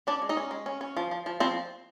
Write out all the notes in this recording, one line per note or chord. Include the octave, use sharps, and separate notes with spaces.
C#4 D4 D5
G#3
D#4 D#5
C#4
G#3
C#4
C#4
F3
F3
F3
F3 C4 C5